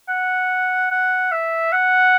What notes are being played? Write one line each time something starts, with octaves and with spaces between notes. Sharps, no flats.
F#5
F#5
E5
F#5